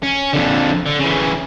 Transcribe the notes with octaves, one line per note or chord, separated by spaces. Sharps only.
C#4
F2 D3
D3
C#3 E3